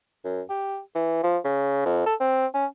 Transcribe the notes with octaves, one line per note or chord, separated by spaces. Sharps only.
F#2
G4
E3
F3
C#3
F2
A4
C4
C#4